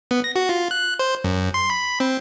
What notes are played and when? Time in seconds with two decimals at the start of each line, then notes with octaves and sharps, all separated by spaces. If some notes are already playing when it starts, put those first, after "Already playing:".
0.11 B3
0.24 A#6
0.36 F#4
0.49 F4
0.71 F#6
0.99 C5
1.24 F#2
1.54 C6
1.70 B5
2.00 C4